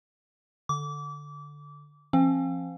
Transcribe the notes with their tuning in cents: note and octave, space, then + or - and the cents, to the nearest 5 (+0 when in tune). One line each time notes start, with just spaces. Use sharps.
D3 +0 D6 -25
F3 -35 C4 +45 F5 +30